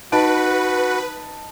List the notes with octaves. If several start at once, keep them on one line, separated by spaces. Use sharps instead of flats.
D#4 F#4 B4 A5 D7